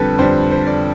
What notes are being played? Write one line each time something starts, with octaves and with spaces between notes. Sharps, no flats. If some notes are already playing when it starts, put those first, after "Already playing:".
Already playing: F2 D3 G3 A4 B4
F2 D3 G3 C5
C5
D5